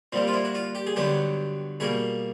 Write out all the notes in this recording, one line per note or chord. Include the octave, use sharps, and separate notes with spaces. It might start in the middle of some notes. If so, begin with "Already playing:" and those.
A#2 G3 A#3 C4
F4
E4
F#4
F4
G4
G#4
G2 D3 F#3 B3 G4
B2 G3 A#3 G#4